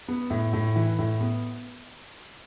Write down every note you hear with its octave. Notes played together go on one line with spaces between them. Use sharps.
B3
A2
A2
E3
A2
B3